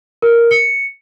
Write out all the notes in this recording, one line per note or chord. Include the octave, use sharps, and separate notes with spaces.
A#4
C#7